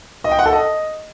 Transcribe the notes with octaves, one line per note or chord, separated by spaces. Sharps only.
D#5
G5
F#5
A4
D#5